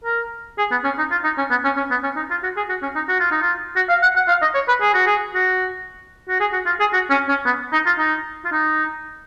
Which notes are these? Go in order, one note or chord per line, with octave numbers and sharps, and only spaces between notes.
A#4
G#4
B3
C#4
D#4
F4
D#4
C#4
B3
C#4
C#4
B3
C#4
D#4
F4
F#4
G#4
F#4
C#4
D#4
F#4
F4
D#4
F4
F#4
F5
F#5
F#5
F5
D#5
C#5
B4
G#4
F#4
G#4
F#4
F#4
G#4
F#4
F4
G#4
F#4
C#4
C#4
B3
D#4
F4
D#4
F4
D#4